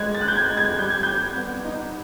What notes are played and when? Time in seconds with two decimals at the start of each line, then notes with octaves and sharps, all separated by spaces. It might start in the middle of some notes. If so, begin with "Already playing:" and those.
Already playing: G#3 F#6 G#6
0.15 A6
0.21 G#3 F#6
0.28 G6
0.35 G#6
0.50 G#3
0.57 G#6
0.79 G3 G6
0.90 G#6
1.03 G3 G6
1.36 B3
1.65 D#4